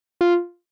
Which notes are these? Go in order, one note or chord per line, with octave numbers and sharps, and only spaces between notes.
F4